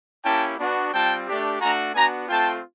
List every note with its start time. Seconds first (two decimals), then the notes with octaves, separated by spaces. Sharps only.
0.24 A#3 C#4 E4 G4 G5 A5
0.58 B3 D4 F#4
0.93 G3 C4 F4 G5 A5
1.27 A3 D4 G4
1.60 A3 D4 F#4 G#5 A#5
1.94 B3 D4 F#4 G#5 A#5
2.29 A3 C4 F4 G5 A5